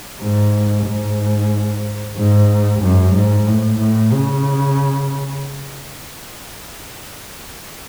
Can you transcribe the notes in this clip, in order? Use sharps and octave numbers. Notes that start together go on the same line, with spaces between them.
G#2
G#2
G#2
F#2
G#2
A2
A2
C#3